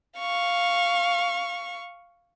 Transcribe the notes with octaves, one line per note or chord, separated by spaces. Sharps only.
F5 C#6